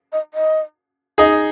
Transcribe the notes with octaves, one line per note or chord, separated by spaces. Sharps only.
D#5
D#5
D#4 G#4 D#5